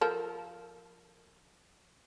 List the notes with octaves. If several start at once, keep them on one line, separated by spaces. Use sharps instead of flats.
F3 A4 A#4